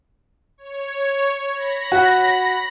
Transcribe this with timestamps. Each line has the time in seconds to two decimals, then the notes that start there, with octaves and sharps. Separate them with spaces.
0.58 C#5
1.51 B5 A#6
1.92 F#4